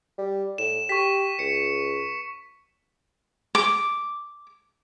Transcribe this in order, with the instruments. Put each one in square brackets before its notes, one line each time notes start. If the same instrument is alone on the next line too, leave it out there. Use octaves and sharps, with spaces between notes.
[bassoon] G3
[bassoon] A2 [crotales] E7
[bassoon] G4 [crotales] C#6 B6
[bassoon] C#2 [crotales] C#7
[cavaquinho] D6